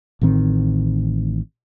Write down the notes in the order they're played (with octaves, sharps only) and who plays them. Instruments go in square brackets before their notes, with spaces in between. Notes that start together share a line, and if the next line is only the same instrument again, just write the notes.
[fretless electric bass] A1 A2 D#3 C4